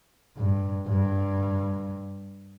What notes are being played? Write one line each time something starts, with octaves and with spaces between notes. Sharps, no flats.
G2
G2